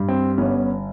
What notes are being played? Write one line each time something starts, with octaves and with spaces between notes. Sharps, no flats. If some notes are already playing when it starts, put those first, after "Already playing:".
Already playing: G2
C4
G1 B3 C#4